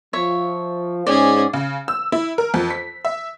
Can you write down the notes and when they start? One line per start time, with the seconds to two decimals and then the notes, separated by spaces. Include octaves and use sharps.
0.13 F3 C#5 E5
1.07 G#2 C#4 G#4 D5
1.53 C#3
1.88 E6
2.12 E4
2.38 A#4
2.54 F2
2.70 B6
3.05 E5